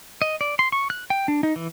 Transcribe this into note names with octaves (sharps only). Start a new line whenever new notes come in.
D#5
D5
C6
C#6
F#6
G5
D4
D#4
E3